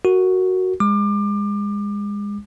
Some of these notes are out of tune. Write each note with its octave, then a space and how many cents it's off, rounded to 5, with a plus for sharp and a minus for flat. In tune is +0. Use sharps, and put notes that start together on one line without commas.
F#4 +0 A#4 -10
G#3 -25 D6 +30